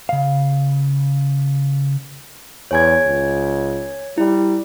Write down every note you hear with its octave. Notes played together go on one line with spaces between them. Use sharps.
C#3 F5
E2 C#5 G#5 G#6
C#2
G3 E4